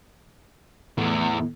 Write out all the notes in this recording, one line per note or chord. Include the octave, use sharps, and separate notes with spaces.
E2 A2